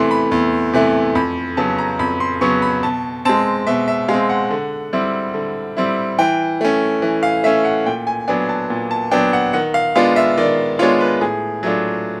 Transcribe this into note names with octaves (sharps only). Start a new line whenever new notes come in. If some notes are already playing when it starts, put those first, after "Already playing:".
Already playing: E2 C3 E3 A3 C6
B5
E2
C3 E3 A3
F2 B5
C#3 F#3 B3 A5
A#5
F2 B5
C6
C#3 F#3 B3 C#6
B5
B2 A5
G#3 C4 A5
B2 E5
E5
G#3 F5
C4
F#5
D3
G3 C4 E4
D3
G3 C4 E4
E3 G5
A3 C#4
E3
F5
A3 C#4 E5
F#5
A#2 G5
G#5
F#3 B3 D4 G#5
A5
A#2
A5
F#3 B3 D4 G5
F#5
D#3 F#5
F5
G#3 B3 D4 F4 F5
E5
D#3 D5
G#3 B3 D4 F4 C#5
B4
A2 G#4
F#3 A3 D4 F4